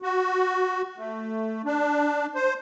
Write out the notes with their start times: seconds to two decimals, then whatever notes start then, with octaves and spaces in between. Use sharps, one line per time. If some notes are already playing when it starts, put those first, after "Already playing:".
0.02 F#4
0.98 A3
1.65 D4
2.35 C5